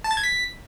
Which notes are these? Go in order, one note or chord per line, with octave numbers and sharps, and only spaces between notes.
A5
A6
G#6
B6